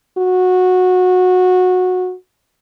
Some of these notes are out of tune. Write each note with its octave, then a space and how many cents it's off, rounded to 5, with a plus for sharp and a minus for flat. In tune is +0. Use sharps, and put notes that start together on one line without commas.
F#4 -15